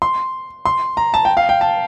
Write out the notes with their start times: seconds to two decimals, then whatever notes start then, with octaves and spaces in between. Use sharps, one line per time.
0.02 C6
0.65 C6
0.97 A#5
1.14 A5
1.25 G5
1.37 F5
1.49 G5
1.61 A5